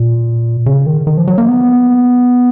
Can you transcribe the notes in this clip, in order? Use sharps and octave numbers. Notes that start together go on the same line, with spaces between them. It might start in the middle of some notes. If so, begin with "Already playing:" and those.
Already playing: A#2
C#3
D#3
D#3
F3
F#3
A#3
B3